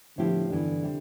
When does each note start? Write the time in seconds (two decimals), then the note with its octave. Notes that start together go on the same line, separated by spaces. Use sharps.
0.17 A2 D3 F3 B3 E4 G4
0.50 G2 D3 E3 B3 D4
0.83 C3 G3